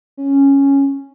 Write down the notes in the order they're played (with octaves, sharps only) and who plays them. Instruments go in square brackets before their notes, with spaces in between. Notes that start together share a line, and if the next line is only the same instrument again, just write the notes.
[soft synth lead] C#4